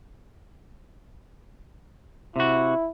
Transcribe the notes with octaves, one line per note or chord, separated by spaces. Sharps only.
C3 E4 F#4